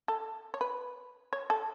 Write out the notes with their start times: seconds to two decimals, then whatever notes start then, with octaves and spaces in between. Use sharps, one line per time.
0.08 A4
0.54 C#5
0.61 B4
1.33 C#5
1.50 A4